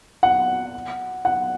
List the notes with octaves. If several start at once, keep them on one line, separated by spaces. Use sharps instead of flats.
F#5
F#5